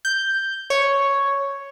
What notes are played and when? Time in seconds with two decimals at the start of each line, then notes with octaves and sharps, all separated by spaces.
0.05 G6
0.70 C#5